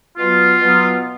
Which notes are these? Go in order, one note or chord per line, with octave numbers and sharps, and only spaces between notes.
B2 F#3 B3 F4
B2 F#3 B3